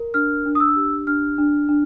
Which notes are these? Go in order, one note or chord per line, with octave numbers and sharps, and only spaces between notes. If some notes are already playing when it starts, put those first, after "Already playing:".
Already playing: A#4
D4 F6
D4
D#6
E6
G4
D4 F6
D4
D4